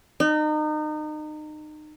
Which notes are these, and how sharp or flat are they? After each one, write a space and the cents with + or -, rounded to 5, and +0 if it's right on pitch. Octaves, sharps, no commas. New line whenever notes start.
D#4 -30